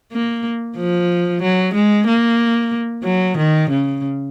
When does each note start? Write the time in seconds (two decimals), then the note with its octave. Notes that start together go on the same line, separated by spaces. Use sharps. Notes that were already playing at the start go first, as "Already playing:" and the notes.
0.12 A#3
0.77 F3
1.42 F#3
1.74 G#3
2.07 A#3
3.04 F#3
3.37 D#3
3.70 C#3